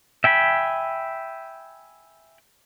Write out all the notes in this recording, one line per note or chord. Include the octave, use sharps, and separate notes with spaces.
E5 G5 G#5 B5